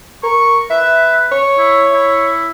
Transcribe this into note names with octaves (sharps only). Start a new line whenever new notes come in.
A#4 C#6
B4 E5
C#5
E4
E4